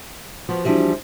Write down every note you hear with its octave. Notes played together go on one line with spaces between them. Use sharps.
F3 B3 F#4
E3 F3 G3 D4 F#4 G4